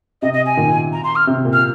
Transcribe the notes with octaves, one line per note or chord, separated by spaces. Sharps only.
C3 D#5
D#5
G#5
A#2 D#3
A#5
C6
F6
C3
A#2
F6